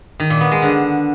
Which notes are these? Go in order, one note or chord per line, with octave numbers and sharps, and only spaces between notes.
D#3
A#2
B3
G#3
D3